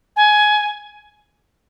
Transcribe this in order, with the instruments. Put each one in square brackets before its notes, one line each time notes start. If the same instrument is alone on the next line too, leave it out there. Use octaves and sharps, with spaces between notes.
[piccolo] G#5